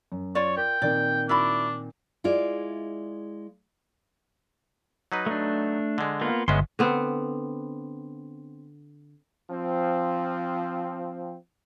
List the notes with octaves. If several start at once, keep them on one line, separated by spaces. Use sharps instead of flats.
F#2
F4 C#5 D5
A#4 G5
A#2 D#3 C4 D5
D4 E4 F#4 B5
G#3 E4 F4 D5
F#3 D#4 B4
A3 D4
D3 G#3
A#3 B3 F4
G1 G#3 B3 C#4 D#5 E5 C6
D3 B3 C4
F3 C4